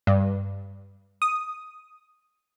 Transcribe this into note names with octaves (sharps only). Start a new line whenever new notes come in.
G2
D#6